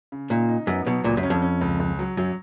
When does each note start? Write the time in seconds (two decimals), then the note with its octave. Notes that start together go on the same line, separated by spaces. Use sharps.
0.12 C#3
0.30 A#2 D#4
0.49 D#4
0.67 F#2 B3
0.86 B2 F#3
1.04 C#2 A#2
1.17 F#2
1.23 C#4
1.30 F2
1.42 C#4
1.61 C#2
1.80 C#2
1.99 F#3
2.17 F#2 F#3